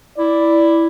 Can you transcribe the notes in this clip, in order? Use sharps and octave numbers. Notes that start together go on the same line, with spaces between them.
E4 D5